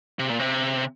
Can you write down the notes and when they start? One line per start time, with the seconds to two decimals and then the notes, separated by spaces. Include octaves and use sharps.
0.19 C3
0.29 A#2
0.39 C3